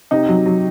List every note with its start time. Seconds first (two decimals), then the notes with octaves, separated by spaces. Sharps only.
0.11 C3 D#4
0.28 F#3
0.46 F#3